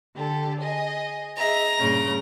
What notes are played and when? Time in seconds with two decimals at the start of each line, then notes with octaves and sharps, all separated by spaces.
0.16 D3 G4 A4
0.60 G#4 D#5
1.37 G#4 D#5 E5 A#5
1.79 G2 A#2 C#3